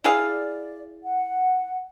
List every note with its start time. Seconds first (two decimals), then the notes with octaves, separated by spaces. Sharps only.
0.04 E4 G#4 D5 F5
1.03 F#5